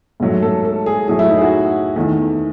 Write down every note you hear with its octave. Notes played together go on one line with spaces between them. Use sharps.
G#2 F#3 A3
A4
A4
G#4
A2 F#3 A3 G#4
E4
D#4
G#4
F#4
E2 D#3 A3